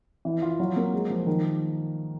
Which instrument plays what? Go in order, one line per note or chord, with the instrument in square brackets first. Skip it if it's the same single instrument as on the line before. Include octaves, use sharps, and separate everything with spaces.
[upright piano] E3
F4
F#3
A#3
G#3
F3
D#3